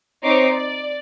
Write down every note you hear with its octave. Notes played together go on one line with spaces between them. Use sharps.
C4 D#4 C5 C#5 D6 C7
D5